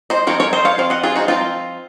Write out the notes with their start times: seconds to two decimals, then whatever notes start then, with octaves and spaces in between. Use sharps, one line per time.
0.10 C5 D#5
0.27 F3 C4 D#4 A#4 C#5
0.40 A#4 C#5
0.53 C5 D#5
0.65 C#5 F5
0.78 F3 C4 F5
0.90 D#5 F#5
1.03 F4 G#4
1.16 D#4 F#4
1.28 F3 C4 D#4 F4